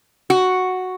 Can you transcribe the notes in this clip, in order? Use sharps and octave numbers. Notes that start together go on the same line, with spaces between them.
F#4